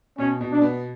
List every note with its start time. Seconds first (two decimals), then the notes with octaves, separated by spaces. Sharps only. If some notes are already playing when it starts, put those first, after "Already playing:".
0.18 B2 C#4
0.41 B2
0.52 D4
0.62 B3